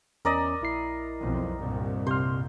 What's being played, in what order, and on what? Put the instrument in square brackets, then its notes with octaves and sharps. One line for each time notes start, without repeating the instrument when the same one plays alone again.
[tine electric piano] E2 C#4 A#5 [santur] A#4 D5 D#5
[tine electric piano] A#1 E4 C7
[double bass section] B1 F2
C2 G2 A#2
[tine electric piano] C3 C6 F6 [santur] C5